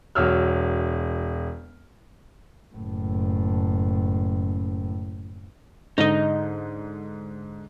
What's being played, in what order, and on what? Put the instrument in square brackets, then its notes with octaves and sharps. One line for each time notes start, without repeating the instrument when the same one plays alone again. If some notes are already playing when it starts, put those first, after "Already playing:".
[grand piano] E1 F#3 C#5 E6 F6
[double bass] F#1 A2
[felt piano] G#2 D3 [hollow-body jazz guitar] D#4 D#5